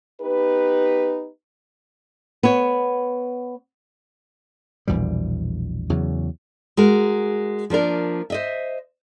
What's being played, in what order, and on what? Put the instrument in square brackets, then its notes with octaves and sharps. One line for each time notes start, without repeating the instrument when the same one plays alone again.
[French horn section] B3 D#4 G4 B4
[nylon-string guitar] B3 C#5
[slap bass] A#1 E2 B2 G3
E2 C#3 F#3
[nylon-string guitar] G#3 F#4 A#4
F3 A#3 D4 A#4
C5 D#5 E5